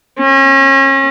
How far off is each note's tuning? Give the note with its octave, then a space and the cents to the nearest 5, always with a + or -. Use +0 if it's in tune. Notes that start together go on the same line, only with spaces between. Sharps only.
C#4 -35